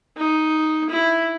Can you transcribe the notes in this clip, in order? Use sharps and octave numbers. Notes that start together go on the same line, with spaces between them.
D#4
E4